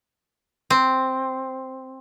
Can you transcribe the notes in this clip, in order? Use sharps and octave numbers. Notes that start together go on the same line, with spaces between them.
C4